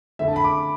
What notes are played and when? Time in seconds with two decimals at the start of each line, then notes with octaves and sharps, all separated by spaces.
0.19 D3 A3 C4 E4 E5
0.28 A5
0.36 B5
0.44 D6